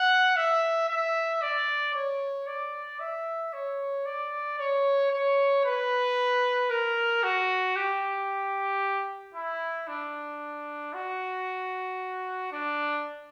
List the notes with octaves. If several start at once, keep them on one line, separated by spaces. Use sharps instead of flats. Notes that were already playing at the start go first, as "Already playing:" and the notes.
Already playing: F#5
E5
E5
D5
C#5
D5
E5
C#5
D5
C#5
C#5
B4
A#4
F#4
G4
E4
D4
F#4
D4